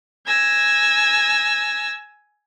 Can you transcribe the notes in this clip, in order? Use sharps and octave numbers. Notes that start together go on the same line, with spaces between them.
G#5 E6 A#6